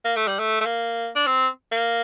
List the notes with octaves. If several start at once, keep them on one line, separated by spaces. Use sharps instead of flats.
A#3
A3
G3
A3
A3
A#3
D4
C4
A#3